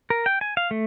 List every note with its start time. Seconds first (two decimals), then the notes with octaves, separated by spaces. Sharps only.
0.10 A#4
0.26 G5
0.41 G#5
0.57 F5
0.71 A3